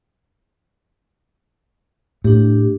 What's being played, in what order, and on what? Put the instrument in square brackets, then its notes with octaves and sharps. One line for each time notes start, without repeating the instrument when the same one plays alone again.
[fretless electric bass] A2 [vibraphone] D4 G4